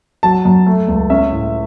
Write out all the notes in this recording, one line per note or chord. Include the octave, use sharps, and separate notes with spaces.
F#3 A5
F#2
A3
C#2
C#4 E5
A2